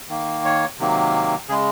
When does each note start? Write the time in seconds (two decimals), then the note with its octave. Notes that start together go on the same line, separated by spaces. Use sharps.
0.09 D#3 A#3
0.45 C#5
0.79 C3 D#3 F#3 A#3
1.48 C#3 G#3 G#4